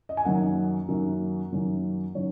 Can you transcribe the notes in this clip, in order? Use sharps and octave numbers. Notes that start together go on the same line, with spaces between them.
D#5
G#5
F#2 D#3 F#3 A#3 F#5
F#2 D#3 F#3 A#3
F#2 D#3 F#3 A#3
D#3 F#3 C#4 C#5